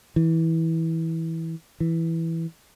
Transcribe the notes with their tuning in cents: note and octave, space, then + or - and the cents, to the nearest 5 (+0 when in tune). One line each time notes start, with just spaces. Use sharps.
E3 -20
E3 -5